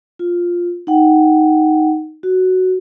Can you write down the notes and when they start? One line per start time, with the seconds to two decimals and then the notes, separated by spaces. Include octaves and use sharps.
0.19 F4
0.87 D#4 F#5 G5
2.23 F#4